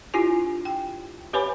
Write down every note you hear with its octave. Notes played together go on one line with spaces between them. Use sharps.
D4 E4 F4 G4 G#5
G5
G4 B4 C#5 G#5 B5 D6